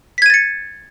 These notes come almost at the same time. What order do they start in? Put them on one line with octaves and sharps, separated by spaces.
B6 G#6 D#7 A6 C#7